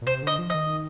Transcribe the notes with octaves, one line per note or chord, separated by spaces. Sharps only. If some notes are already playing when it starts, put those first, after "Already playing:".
A#2
C3 C5
D3 D#5
F3
D#3 D#5